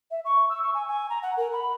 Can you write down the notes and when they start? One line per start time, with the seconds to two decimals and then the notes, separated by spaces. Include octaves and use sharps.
0.11 E5
0.25 C#6
0.49 E6
0.63 C#6
0.74 G#5
0.88 G#5
1.10 A#5
1.23 F#5
1.37 A#4
1.53 B5